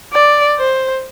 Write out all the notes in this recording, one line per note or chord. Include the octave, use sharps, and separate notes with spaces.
D5
C5